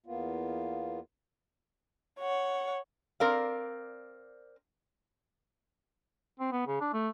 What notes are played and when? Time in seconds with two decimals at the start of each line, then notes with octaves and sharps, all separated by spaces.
0.06 E2 A#3 B3 F4
2.20 C#5 F#5
3.20 C4 A#4 D5 F5
6.40 C4
6.52 B3
6.67 C#3
6.81 D4
6.93 A3